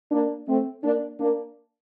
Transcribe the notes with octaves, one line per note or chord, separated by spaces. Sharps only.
A#3 D4
A3 C4
A#3 D4
A#3 D4